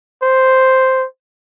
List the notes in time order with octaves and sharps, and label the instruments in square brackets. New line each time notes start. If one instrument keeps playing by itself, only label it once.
[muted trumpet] C5